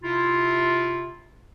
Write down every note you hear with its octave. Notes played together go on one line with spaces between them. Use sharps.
C3 E4 F4